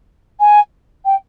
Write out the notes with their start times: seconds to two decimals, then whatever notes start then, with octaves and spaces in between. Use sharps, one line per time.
0.40 G#5
1.05 G5